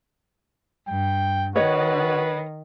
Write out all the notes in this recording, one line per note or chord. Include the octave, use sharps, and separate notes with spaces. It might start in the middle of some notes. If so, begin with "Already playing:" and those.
G2 G5
D#3 F#4 B4 C#5 D#5